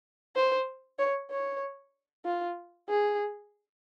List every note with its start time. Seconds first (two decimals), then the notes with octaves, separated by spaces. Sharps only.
0.35 C5
0.99 C#5
1.30 C#5
2.25 F4
2.89 G#4